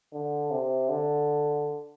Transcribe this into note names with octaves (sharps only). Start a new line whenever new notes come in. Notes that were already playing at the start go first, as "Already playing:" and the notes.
D3
C3
D3